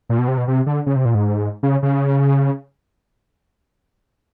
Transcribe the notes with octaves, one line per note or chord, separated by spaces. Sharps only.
A#2
B2
C3
B2
C3
D3
C#3
C3
A#2
G#2
C#3
C#3